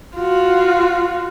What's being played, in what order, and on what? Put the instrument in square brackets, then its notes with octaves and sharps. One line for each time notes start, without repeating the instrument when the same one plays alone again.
[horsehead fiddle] F4 F#4